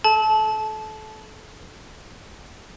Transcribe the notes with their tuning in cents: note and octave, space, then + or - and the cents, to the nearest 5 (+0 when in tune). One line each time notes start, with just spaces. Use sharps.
A4 -30 A5 -20